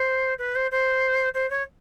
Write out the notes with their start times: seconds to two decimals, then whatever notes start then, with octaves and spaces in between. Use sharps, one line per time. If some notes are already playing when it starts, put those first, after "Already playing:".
Already playing: C5
0.38 B4
0.55 C5
0.71 C5
1.34 C5
1.50 C#5